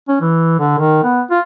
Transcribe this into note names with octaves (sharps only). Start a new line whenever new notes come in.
C#4
E3
D3
D#3
B3
F4